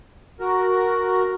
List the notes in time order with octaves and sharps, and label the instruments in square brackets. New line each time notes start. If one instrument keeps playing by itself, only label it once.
[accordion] F#4 A#4